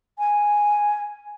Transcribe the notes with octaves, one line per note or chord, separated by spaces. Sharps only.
G#5